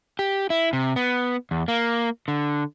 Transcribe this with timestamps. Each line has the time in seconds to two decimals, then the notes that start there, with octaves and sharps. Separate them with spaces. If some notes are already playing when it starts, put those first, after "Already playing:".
0.19 G4
0.50 E4
0.73 C3
0.96 B3
1.51 E2
1.68 A#3
2.28 D3